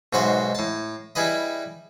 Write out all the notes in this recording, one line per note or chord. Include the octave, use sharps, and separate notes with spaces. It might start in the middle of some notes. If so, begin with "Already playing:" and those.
B1 G#2 F#4 B4 C5 E5
A2 A5
G3 E4 G#4 B4 D#5